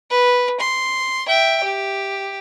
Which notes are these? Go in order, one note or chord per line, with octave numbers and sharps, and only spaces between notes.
B4
C6
E5 G5
G4